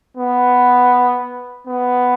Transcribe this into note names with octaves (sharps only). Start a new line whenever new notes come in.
B3
B3